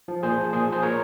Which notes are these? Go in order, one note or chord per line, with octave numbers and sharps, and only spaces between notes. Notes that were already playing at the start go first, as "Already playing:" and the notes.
F3
A#2 G#4 C5
F3
A#2 G#4 C5
F3
G#4 C5
A#2 A#4 C#5